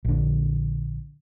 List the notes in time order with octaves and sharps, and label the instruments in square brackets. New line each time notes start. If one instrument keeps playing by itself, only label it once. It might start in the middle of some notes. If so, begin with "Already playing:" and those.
[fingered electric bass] A#1 D3